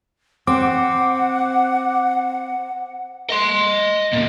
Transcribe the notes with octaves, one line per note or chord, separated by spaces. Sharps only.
C4 F#5 D6
D#5 C6
A#2 C#3